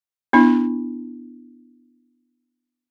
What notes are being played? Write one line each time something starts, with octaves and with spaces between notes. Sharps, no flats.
B3 D4 E4